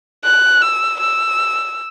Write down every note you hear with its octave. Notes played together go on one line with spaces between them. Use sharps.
F#6
E6
E6